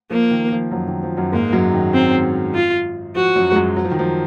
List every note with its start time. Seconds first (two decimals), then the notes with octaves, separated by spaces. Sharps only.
0.11 F3 A#3
0.31 D#3
0.52 F3
0.71 F#2 F#3
0.88 D#3
1.03 F3
1.17 F#2 F#3
1.32 G#2 G#3 A#3
1.53 F#2 F#3
1.73 D#3
1.94 C4
2.55 F4
3.15 F3 F#4
3.36 F#2 F#3
3.52 G#3
3.56 F#2 F#3
3.76 F#3
3.84 F3
3.91 D#3
3.99 F3